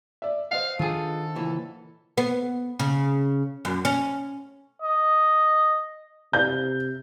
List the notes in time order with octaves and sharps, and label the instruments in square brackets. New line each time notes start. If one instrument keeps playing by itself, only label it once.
[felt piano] D5 E5
[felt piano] C5 D#5 F#5 [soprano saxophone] F5
[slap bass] D#3 D4 [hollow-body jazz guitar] F4 G#4 [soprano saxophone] A4
[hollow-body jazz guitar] C#2 A#2 E3
[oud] B3
C#3
F#2
C#4
[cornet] D#5
[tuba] C3 [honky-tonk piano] G6